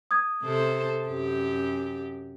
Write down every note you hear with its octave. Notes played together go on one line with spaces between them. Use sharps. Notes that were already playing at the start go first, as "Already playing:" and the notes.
D#6 G#6
C3 A4 C5
F#2 G4